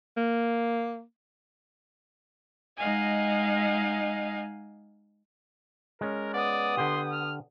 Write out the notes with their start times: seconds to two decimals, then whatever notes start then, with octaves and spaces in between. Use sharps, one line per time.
0.17 A#3
2.77 G#3 D#4 D#5 F5 F#5 G#5
6.01 G#3 C#4 A#4
6.33 B3 D5 D#6
6.77 D3 G4 C6
7.12 F6